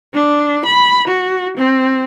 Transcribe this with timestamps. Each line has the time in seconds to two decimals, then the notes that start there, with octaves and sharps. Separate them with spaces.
0.14 D4
0.66 B5
1.08 F#4
1.57 C4